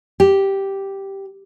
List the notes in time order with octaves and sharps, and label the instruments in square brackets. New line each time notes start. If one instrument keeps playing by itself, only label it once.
[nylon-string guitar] G4